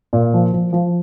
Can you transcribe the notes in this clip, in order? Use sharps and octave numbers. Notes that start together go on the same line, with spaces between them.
A#2
F3
F3
F3